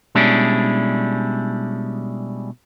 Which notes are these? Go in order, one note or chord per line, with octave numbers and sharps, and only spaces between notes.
B2 G3 G#3 C#4 D4 E4